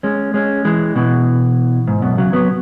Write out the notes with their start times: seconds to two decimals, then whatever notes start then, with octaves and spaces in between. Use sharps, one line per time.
0.03 G#3 C#4
0.34 G#3 C#4
0.65 E3 G#3
0.95 B2 E3
1.88 G#2
2.02 F#2 B2
2.18 C#3 F#3
2.33 F#3 B3